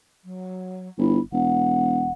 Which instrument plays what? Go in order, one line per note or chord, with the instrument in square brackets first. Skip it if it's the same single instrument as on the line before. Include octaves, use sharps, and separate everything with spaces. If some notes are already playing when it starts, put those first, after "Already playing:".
[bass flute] F#3
[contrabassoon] G1 [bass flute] E4
[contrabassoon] E1 [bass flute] F#5